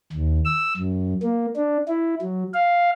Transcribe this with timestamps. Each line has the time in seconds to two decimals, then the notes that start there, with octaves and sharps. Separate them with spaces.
0.13 D#2
0.45 E6
0.77 F#2
1.23 A#3
1.56 D4
1.88 E4
2.22 F#3
2.54 F5